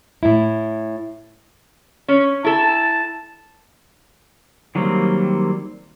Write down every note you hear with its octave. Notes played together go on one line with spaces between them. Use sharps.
A2 E4
C#4
E4 A4 A5
D#3 F#3 G3 A#3 C4